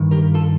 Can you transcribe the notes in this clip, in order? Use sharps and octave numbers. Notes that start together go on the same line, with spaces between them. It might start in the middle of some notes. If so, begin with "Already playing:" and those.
Already playing: G2 D#3
G4 A#4
F4 A4